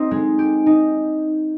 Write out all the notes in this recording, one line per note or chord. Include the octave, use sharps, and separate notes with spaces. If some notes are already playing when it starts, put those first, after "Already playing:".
Already playing: C4 D#4
G#3
G4
D#4